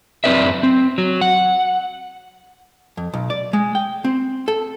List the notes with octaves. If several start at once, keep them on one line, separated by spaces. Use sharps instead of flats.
F#2 G3 C4 B4 D5 E5
C4
F#3
F#5
F2
B1
D5
G#3
G5
C4
A4